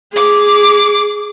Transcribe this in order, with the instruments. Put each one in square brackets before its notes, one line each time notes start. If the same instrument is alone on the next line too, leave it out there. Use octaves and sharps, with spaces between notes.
[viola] G#4 D6